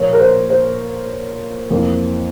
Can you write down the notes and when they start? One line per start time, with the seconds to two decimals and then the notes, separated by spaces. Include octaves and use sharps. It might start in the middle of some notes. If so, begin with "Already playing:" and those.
Already playing: A#2 F3 A#3 C#5
0.13 A#4
0.19 C5
0.50 C5
1.70 F2 E3 A#3